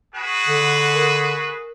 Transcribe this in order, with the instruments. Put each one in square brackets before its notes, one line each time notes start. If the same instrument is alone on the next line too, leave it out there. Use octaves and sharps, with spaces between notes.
[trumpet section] F#4 G#4 B4
[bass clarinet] D3
[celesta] A#4